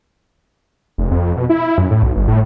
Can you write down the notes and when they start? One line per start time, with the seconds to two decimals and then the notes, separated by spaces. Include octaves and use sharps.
0.98 F1
1.11 F2
1.37 B2
1.50 E4
1.78 F#2
1.91 A2
2.03 B1
2.16 G1
2.28 A2